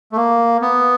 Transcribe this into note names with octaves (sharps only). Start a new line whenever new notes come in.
A3
A#3
B3